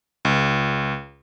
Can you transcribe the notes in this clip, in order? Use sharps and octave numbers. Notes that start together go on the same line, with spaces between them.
C#2